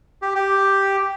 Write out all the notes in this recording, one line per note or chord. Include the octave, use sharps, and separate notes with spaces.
G4
G4